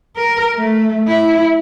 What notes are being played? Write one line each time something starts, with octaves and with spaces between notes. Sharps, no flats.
A#4
A3
E4